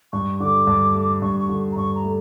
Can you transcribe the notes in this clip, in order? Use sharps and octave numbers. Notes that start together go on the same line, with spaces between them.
G2 C#6
D3 D6
G2
A3
G2 C#6
C#6
D3
A#5
G2 C#6
A#5
A3